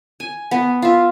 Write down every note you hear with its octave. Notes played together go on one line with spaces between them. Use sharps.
G#5
B3
F4 E5